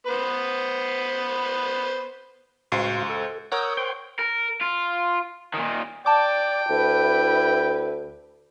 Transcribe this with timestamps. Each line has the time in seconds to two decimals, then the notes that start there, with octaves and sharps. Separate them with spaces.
0.07 B3 B4 C5
2.72 C#2 A2 F#4 C5 F5
3.09 A4
3.52 A#4 C#5 F#5 D#6 E6 G6
3.77 C5 G5 C6
4.19 A#4
4.61 F4
5.54 A#2 D#3
6.06 D5 G5 A5 D6
6.70 D2 E4 B4